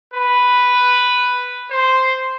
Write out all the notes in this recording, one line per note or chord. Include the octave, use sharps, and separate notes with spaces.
B4
C5